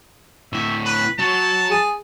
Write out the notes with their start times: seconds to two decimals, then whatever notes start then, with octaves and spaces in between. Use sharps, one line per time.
0.53 D2 A2 E5
0.85 B4
1.19 F#3 A5
1.71 G#4